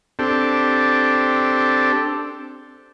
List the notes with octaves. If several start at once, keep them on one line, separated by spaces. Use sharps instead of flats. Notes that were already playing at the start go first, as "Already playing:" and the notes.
C4 D4 G4 A4